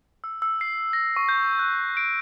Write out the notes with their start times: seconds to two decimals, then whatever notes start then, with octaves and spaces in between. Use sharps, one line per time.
0.24 E6
0.42 E6
0.61 C7
0.93 A#6
1.16 C#6
1.29 G6
1.59 F#6
1.97 D7